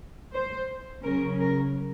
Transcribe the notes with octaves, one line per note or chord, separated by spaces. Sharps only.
C5
C#3 F#3 C#4 A#4
A#4